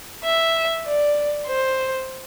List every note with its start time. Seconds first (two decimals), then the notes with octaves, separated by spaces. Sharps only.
0.24 E5
0.86 D5
1.47 C5